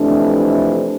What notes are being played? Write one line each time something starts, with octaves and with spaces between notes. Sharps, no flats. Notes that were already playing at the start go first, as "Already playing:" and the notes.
Already playing: F2 C3 E3 A3 D4